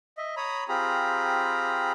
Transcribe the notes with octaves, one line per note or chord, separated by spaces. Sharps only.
D#5 E5
C#5 A#5 B5 D#6
C4 F4 G4 G#4 A#5 B5